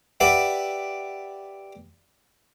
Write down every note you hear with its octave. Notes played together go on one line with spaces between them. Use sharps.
G4 B4 D5 E5 F#5